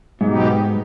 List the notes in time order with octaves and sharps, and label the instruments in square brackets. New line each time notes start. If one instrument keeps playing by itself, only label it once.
[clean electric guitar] G#2 [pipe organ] B2 F#3 B3 D#4 G4